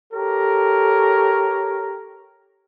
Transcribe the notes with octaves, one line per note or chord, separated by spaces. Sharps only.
G4 A4 A#4 C#5